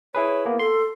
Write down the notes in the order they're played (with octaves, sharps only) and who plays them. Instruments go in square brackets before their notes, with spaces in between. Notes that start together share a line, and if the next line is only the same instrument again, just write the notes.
[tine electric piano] E4 G#4 B4 [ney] C#5
[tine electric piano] A#3 B3
[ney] A4 [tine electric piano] C6